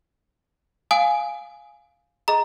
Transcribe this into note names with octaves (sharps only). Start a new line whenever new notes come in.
F5 G#5 D#6
G#4 D#5 A#5 D#6